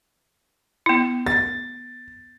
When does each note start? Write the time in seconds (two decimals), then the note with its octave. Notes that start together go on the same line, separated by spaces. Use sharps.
0.86 B3 E4
1.26 A6